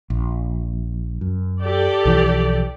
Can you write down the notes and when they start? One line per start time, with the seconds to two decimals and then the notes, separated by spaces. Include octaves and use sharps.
0.10 A#1
1.21 F#2
1.62 G4 A4 D5
2.05 B1 E3 F3